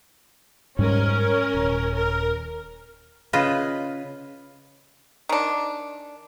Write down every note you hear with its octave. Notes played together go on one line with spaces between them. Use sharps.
G#2 G3 C#4 A#4
D#1
A#4
C#3 F4 B4 D#5
D#3 D4